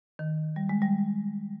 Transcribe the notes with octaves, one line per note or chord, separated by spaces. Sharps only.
D#3
G3
G#3
G3